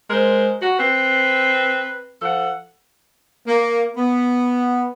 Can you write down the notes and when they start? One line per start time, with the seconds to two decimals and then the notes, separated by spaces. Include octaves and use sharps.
0.09 G#3 A#4 C5
0.61 F#4
0.79 C4 B4
2.22 F3 A4 F#5
3.47 A#3
3.97 B3